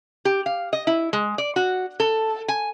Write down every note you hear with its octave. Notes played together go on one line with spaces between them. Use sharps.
G4
F5
D#5
E4
G#3
D5
F#4
A4
G#5